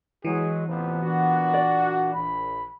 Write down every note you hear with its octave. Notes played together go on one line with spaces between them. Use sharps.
E3 F#3 G#3 G#4
A1 C3 F3 B3
A#2 D4 F#4
D5
A#1 B5